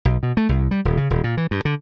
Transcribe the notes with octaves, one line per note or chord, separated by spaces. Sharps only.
B1
B2
A3
C2
G3
D#1
C#3
D#1
A#2
E3
G2
D3